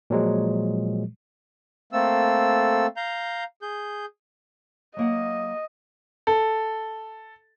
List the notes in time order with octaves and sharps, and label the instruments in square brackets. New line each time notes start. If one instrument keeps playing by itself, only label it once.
[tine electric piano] A#2 F3 F#3 G#3
[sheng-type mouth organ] A3 A#3 C4 A4 E6
F5 A#5 G6
G#4 G6
[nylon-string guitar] F#3 A#3 F#5 [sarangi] D#5
[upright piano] A4